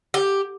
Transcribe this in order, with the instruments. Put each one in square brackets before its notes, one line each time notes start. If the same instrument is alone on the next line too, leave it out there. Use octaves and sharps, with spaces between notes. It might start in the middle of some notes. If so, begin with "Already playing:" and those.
[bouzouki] G4